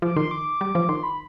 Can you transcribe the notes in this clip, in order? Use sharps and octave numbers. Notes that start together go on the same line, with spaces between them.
F3 D6
D#3 C6
D6
G3
F3
D#3 C6
B5